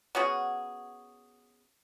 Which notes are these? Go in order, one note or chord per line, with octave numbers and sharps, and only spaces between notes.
B3 C#4 F#4 G#4